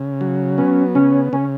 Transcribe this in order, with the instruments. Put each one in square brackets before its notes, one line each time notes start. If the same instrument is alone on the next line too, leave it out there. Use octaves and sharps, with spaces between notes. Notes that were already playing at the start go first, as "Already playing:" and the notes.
Already playing: [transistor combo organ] C#3
F#3
[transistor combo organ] B3 [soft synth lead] C#4
[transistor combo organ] C#3 [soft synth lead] C#4
[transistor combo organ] C#3 [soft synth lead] C#4